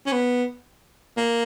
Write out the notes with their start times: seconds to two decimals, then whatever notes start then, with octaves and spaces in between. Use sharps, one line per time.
0.06 C#4
0.12 B3
1.17 A#3